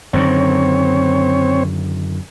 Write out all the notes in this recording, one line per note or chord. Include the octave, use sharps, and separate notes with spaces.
F#2 D3 D#3 C4 C#5